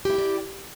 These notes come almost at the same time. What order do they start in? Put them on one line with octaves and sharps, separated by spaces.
G4 E4 G5 D5